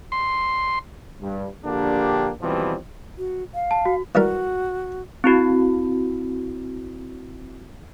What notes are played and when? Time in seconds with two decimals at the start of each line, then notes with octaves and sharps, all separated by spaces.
0.12 C6
1.21 G2
1.65 A#1 D3 A#3 D4 G4
2.41 D#2 B2 E3 F3 G3 C4
3.18 F#4
3.54 F5
3.71 A5
3.86 F#4
4.15 E3 G3 F#4 A#4
5.24 C4 E4 F#4